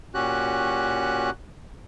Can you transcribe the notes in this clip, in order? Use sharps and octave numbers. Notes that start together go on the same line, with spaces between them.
A#2 C#4 F#4 G4 F#6